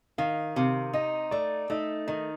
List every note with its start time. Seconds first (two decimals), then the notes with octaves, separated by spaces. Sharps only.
0.18 D#3 F5
0.56 C3 F5
0.93 D#4 D#5
1.31 A3 D5
1.70 A3 D#4
2.07 D#3 D#4